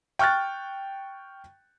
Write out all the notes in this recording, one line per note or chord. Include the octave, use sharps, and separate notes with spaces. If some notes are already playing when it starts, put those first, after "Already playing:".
G5 C#6 F6 F#6 A6